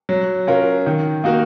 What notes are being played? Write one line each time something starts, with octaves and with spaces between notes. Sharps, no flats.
F#3
C#4 F4 A#4
D#3
A#3 D#4 F#4 A#4